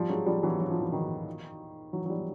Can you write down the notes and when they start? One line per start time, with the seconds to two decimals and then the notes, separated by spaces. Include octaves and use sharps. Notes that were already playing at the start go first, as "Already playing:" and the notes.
Already playing: F3 G3
0.09 F#3 G#3
0.26 F3 G3
0.43 E3 F#3
0.60 F#3
0.71 F3
0.82 E3
0.92 D#3 F3
1.93 E3 F#3
2.06 F#3
2.10 F3 G3